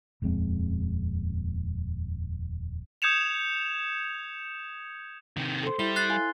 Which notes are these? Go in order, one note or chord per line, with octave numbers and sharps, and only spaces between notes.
D#1 F2 G#3 C4
D#6 G6 G#6 C#7 E7 F7
C3 D#3
A4 C5
G3 E4 G7
F#6 A6 C7
F5 G#5